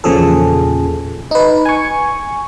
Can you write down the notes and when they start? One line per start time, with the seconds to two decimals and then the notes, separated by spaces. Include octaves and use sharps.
0.04 E2 A#2 C#3 F3 G#4 A4
1.31 D#4 B4
1.65 G#5 C#6